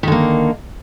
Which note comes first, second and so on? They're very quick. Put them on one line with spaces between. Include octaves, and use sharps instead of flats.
D#3 D3 A#3